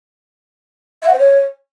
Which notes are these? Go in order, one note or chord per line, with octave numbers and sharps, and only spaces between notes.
E5
F#5
C5
C#5